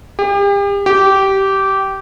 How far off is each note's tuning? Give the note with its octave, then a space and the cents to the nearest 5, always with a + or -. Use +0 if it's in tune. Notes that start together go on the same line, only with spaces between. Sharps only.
G4 +40
G4 -15